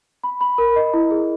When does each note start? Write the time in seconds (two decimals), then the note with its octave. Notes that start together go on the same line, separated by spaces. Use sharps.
0.24 B5
0.41 B5
0.58 A#4
0.76 D#5
0.94 E4
1.11 G#4